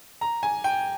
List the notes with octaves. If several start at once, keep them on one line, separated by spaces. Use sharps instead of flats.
A#5
G#5
G5